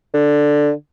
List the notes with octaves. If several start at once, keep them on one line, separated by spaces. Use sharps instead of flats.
D3